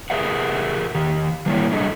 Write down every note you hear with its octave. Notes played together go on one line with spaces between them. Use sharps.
G4 G#4 A#4 B4 E5 F#5
D#3 G4
D#3 G3 A#3 E4 C#5
F#3 G3 D4 G#4 A4 D#5